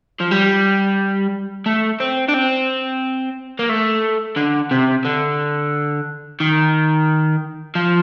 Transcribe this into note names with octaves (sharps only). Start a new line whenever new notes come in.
F3
G3
A3
C4
D4
C4
A#3
A3
D3
C3
D3
D#3
F3